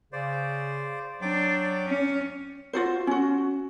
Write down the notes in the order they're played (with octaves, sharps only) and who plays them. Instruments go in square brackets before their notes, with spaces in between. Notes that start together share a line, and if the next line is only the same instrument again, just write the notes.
[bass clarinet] C#3 [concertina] C5 D5
[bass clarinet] F#3 [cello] D4 [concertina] D5 G5 D6
[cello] C#4
[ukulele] F4 F#4 C5
C#4 F#4